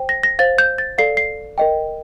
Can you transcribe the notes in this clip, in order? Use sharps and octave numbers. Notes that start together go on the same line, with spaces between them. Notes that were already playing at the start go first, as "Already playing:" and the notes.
Already playing: C5 G5
A#6
A#6
C5 F5 A6
G6
A6
A4 D5 F5 C7
C7
A#4 D#5 G5